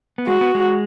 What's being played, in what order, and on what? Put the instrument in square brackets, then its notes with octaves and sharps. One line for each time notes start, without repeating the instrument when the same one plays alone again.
[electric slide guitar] B3
[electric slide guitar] G#3 [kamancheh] F#4
[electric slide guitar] B3
G#3